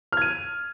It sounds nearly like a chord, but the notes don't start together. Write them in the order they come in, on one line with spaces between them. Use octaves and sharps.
F6 G#6 D#7